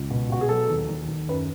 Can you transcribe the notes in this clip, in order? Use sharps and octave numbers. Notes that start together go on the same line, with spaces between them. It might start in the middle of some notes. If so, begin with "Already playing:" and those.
Already playing: C#2
B2
B2 F#4
G#4
F#3 A4
D#2
D#2
D#2
F#2 B4